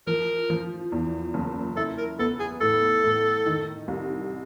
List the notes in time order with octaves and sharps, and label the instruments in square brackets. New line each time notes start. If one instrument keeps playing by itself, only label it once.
[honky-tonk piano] F3 [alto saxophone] A#4
[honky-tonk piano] F3
E2
F#1
[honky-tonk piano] E4 [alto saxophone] A4
[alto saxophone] A#4
[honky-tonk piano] B3 [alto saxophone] A4
[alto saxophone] G#4
[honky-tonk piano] A2 [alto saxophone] A4
[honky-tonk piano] A2
D#3
C2